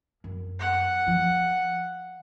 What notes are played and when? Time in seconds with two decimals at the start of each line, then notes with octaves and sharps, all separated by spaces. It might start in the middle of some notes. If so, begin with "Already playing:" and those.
0.24 F#2
0.59 F#5
1.07 F3